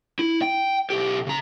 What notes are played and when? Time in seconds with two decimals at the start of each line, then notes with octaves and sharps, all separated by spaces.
0.19 E4
0.42 G5
0.90 B1 G4
1.27 C#3 A#5